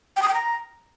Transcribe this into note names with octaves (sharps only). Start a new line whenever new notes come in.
G5
D#6
G5
A#5